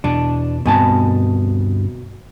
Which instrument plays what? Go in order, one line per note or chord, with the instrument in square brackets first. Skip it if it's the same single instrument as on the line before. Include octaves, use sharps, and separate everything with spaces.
[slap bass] E2 B2 [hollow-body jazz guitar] D4
[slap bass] D2 G2 C4 [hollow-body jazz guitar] B2 G#5 A5